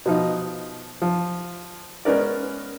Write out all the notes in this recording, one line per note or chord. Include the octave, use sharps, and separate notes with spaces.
B2 F3 D#4
F3
G#3 B3 C#4 A#4 D5